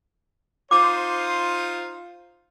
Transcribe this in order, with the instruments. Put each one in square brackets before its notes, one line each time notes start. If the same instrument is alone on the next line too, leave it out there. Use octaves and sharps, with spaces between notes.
[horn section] D#4 F4 C5 [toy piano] D6